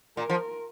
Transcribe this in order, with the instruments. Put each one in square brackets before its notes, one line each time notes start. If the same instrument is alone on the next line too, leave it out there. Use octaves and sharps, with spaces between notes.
[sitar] A#2 [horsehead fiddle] A#4
[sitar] F3